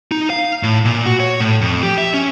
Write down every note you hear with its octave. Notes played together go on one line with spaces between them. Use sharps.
D#4
F5
A2
A#2
F#4
C#5
A2
F2
G4
E5
C#4